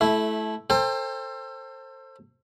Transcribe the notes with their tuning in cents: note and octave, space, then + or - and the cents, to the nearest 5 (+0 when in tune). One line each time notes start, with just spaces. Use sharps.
A3 -20 E4 +0
A4 +30 C5 +15 G5 +35